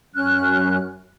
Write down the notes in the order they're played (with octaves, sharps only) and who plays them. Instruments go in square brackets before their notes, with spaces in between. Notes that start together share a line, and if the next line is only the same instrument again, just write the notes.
[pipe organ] F#2 [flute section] C#4 F6 F#6